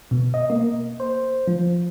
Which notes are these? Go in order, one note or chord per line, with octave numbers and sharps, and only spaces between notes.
B2
D#5
A#3
C5
F3